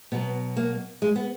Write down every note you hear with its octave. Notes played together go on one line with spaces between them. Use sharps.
B2 F#3 B3
A#3
G#3
B3